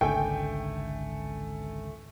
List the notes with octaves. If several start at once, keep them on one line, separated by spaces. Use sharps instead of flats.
G#1 C#2 D3 A3 G5 G#5